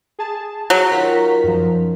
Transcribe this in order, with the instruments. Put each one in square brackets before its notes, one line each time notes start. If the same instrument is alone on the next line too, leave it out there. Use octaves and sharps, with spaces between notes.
[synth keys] G#4 A5
[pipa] F#3
[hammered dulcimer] D#3 [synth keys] F4 A#5 B6
[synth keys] F#2 F3